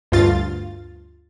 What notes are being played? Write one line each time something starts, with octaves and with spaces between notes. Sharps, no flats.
D2 G2 F4 A6